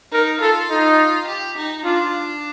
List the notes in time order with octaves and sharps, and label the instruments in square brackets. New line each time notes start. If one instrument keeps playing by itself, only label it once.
[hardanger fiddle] D#4 [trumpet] A#4
[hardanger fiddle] F4 [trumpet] A4
[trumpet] D#4
[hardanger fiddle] G4
D#4
[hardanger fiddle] D4 [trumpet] F4